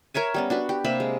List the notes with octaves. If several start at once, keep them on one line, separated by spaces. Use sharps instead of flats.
A#4 C#5 E5 G#5
G3 B3 C#4
D4 F#4 B4
G4
C3 A#3 E5 B5
G#3